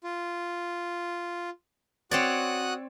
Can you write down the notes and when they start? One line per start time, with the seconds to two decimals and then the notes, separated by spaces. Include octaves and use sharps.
0.04 F4
2.11 C4 F#4 C#5 D5 D#6 F#6